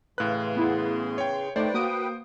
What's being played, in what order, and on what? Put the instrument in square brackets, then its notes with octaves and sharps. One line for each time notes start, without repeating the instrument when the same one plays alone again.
[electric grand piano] A2 F#6 [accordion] C#3 E3 C6 [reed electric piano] B4 F5
[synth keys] B3 E4 G#4
[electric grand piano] C#5 G5
[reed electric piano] A3 D#4 [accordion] B4 G5 [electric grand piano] C5 [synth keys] D5
[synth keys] A#3 D#6 D7 [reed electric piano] F#4